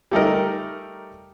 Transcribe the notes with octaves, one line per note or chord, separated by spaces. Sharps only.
G3 A3 D#4 A#4